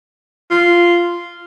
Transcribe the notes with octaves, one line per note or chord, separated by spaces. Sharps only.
F4